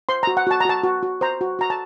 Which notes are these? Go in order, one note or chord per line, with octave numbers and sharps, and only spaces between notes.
C5 C6
F#4 A#5
F#5
F#4 A5
A#5
F#4 A5
F#4
F#4
C5 A#5
F#4
F#4 A#5
A5